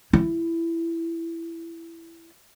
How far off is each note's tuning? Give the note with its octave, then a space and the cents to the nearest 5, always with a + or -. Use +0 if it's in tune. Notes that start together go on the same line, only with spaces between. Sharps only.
E4 +15